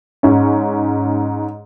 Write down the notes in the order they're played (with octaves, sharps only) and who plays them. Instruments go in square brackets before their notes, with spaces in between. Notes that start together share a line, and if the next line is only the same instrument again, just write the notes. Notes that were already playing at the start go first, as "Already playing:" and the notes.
[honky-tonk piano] G#2 C#4